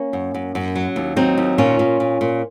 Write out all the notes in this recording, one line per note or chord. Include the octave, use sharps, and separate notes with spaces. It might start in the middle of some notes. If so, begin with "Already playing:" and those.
Already playing: A#3 C#4
F#2
F#2
F#2
F#3
D#2
F#3 C4 D#4
D#2
A#2 C#4 F4
A#2
A#2
A#2